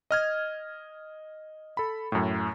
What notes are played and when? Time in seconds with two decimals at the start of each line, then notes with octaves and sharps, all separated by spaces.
0.11 D#5 F6 G#6
1.77 A4 B5
2.12 F#2 A2